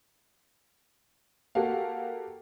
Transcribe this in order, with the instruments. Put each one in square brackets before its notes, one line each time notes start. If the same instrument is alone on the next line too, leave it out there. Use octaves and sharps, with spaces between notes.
[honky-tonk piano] A#3 F#4 G4 A4 F5